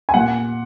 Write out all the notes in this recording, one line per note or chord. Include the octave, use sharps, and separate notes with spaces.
G#5
A#2 F#5